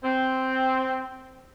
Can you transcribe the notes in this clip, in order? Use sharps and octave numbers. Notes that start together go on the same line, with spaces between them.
C4